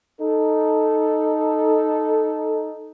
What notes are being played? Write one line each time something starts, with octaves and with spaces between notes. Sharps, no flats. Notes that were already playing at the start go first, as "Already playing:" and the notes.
D#4 A4